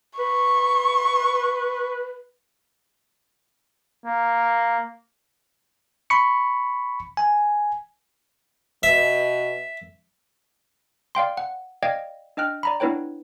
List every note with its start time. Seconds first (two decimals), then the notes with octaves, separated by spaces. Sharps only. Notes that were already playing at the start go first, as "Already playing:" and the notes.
0.19 B4 C#6
4.06 A#3
6.10 B5 C#6 C#7
7.17 G#5
8.83 B2 E5
11.15 D5 F5 G5 C6
11.37 F#5
11.83 D5 D#5 F5 G5 G#6 A#6
12.37 D4 D#5 G5 F6 F#6
12.63 D5 A#5 B5
12.80 B3 D4 E4 B4 C#5 G5